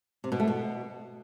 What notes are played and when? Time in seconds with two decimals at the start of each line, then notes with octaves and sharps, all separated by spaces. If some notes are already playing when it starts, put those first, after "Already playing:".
0.24 C3
0.32 B2
0.40 A3
0.48 B2